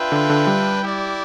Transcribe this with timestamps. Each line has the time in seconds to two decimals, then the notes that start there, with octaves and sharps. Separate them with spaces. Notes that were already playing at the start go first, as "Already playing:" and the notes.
Already playing: D4 F4 B4 E5 G5
0.12 D3
0.29 D3
0.47 G3
0.82 E4 G4 D5